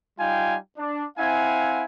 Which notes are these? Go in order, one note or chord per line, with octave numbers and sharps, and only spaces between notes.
G3 D#4 F4 F5 G5 G#5
D4
C4 E4 F5 F#5 G#5